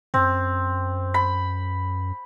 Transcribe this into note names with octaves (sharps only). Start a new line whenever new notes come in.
F#2 C4
B5